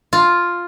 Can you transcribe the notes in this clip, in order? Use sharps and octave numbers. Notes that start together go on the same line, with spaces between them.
F4